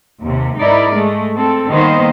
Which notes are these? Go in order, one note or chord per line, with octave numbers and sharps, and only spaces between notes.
D#2 C3
G#2 D#4 E4 A#4 D5
G#3 A3
C4 A4
D#3 G3 A#3 B3 C5 D#5